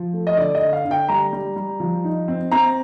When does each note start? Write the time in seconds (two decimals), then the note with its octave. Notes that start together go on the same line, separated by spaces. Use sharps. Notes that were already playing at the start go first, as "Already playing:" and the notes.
Already playing: F3
0.13 A3
0.27 D#5
0.37 D3 D5
0.55 D#5
0.61 D3
0.73 F5
0.85 D3
0.91 G5
1.08 G3 A#5
1.33 G3
1.56 G3
1.80 F3
2.04 D#4
2.28 C4
2.52 C4 A#5